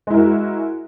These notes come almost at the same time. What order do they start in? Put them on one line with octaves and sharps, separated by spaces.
G#3 E4 A#4 F#4